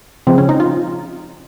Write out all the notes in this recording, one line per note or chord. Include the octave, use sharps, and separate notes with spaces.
C#3 F3 G#3 C4
C#4
D#4
F4